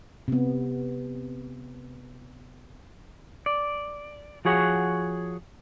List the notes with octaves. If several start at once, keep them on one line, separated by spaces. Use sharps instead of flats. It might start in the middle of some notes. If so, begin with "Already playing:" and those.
C3 B3
D5
F3 F#4 G#4 C#5 F#5